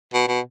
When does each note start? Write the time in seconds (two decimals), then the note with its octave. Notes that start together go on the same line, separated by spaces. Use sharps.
0.13 B2
0.28 B2